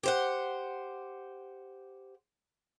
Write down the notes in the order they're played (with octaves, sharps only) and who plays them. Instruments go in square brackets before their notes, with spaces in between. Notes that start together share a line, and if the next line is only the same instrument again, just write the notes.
[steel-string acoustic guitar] G4 C5 F#5